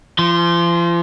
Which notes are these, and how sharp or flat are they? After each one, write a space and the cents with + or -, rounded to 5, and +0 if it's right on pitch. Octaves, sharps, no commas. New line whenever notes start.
F3 -40 C6 +0